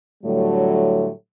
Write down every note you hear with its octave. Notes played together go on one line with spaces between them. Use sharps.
A2 D3 F#3 G3 A3